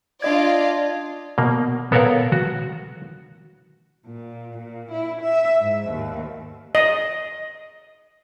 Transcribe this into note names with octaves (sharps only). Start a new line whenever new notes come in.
D4 F4 D5 D#5 G#6
B2 A#3
B3 A4 A#4 C#5 F5 F#5
F#4
A#2
A#2
E4
E5
G#2
D#2
D#5